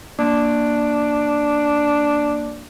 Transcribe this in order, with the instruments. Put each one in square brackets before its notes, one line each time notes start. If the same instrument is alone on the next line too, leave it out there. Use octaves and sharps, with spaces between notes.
[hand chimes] A#3 [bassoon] D4